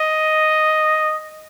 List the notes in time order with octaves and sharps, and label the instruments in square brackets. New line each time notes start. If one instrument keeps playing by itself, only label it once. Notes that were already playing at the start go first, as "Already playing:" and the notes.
Already playing: [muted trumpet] D#5